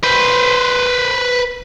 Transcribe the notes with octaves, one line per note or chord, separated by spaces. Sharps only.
B4 C5